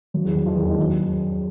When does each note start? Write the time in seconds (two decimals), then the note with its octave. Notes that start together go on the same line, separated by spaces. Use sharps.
0.14 F#2 F#3
0.25 E2 E3
0.35 F#2 F#3
0.46 F2 F3
0.54 E2 E3
0.62 D#2 D#3
0.71 G#2 G#3
0.79 F#2 F#3